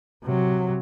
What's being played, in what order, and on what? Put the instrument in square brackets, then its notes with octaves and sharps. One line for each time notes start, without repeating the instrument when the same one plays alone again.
[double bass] C3 F#3